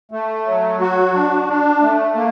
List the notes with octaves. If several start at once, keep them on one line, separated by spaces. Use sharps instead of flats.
A3
F#3
F#4
D4
D4
A3
A#3